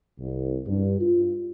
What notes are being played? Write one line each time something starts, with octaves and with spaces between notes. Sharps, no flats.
C2
G2
F4